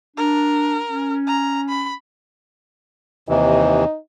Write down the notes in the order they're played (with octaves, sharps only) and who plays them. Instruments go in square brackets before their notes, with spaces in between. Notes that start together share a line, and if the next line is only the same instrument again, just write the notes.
[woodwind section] D4 [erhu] A#4
[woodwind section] C#4
[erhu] A#5
B5
[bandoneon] D#2 C3 E3 [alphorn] D#4